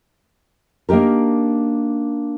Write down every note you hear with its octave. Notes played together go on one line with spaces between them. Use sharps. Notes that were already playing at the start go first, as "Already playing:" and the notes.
A#3 D4 D#4 G4 A#4